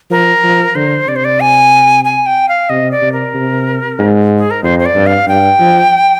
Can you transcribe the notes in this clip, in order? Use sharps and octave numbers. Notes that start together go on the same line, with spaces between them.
F3 A#4
F3
D3 C5
C3 D5
C5
D5
G#5
G#5
G5
F5
C3 D#5
D5
C3
A#4
C3
G#2
G#4
A#4
F2 C5
C5
D5
G2
F5
G2 G5
F3